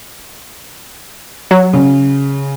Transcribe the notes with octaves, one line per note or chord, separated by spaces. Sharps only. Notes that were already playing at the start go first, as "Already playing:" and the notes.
F#3
C#3